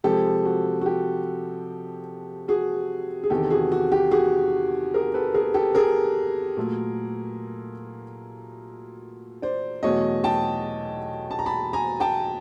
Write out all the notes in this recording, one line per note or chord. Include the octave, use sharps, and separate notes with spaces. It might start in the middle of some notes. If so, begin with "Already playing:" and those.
C3 F3 G#3 G4 A4
F#4
F#4
G4
F#4 G#4
G#4
E2 C3 D#3 G4 A4
F#4 G#4
F#4
G4
F#4 G#4
G#4 A#4
A4 B4
G#4 A#4
G4 A4
G#4 A#4
A#2 F#3 A3
C5 D5
E2 B2 F#3 A3 C#5 D#5
G5 A5
A5
A#5
A5 B5
G#5 A#5
G5 A5